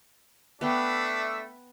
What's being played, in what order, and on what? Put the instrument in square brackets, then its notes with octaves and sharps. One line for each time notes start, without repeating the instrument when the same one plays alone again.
[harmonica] A3 D4 E5 [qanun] B3 G5